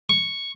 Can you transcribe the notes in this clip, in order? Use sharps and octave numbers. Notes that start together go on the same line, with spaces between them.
C#6